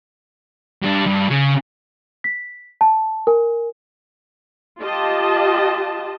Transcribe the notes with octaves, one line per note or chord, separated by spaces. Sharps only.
G2 D4
G2
C#3
B6
A5
A#4 G#5
F4 G4 D#5 A5